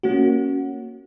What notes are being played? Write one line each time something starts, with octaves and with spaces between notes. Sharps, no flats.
A#3 C#4 F#4